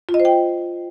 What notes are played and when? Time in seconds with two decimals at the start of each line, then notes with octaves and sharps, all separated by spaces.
0.09 F4
0.14 D#5
0.20 C5
0.25 G5